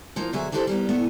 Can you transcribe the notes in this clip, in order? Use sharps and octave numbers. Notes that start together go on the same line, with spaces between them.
F3 A#3 D#4
D2 B2 F#3 G#4 E5
E3 D4 E4 G4 A4 C5
G3 A#3 B3
A2 A3 B3